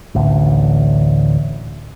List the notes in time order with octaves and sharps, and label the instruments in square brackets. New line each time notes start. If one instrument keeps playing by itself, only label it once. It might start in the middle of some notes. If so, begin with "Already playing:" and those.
[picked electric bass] A1 D2